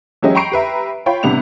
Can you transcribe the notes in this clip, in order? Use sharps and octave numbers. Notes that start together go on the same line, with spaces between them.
E3 F#3 G#3 C#4 G4 D#5
G5 A#5 B5 C#6 C7 D7
G4 B4 E5 A#5
F4 C#5 G5 B5
A1 C3 G3 B3 D4 F7